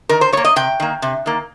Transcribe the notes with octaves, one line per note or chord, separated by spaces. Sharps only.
D#3 A#4
C5
G3 C#5
A#3
D#5
C3 G5
D#3 A#3
C3
D#3 A#3